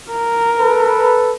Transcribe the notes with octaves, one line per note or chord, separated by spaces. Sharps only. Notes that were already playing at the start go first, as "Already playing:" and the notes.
A#4
A4 B4